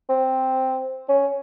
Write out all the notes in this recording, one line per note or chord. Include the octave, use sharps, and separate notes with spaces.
C4
C#4